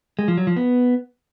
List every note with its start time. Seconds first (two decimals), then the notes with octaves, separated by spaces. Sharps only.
0.19 G#3
0.28 F3
0.37 F#3
0.47 F3
0.56 B3